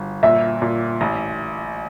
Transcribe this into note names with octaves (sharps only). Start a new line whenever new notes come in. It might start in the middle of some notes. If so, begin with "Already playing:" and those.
Already playing: G1
A#2 E5
A#2
A1